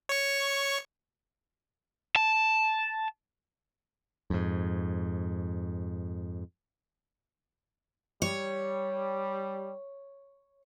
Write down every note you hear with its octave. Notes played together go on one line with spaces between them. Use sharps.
C#5 C#6
A5
F2 G#2
G3 C#5